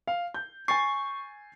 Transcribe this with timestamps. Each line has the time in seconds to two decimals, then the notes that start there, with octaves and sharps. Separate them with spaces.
0.07 F5
0.34 G6
0.68 G#5 C#6 A6 C7